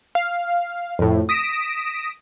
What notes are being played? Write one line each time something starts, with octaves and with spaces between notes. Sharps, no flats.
F5
F2 A2
D#6 A#6 B6 D7 E7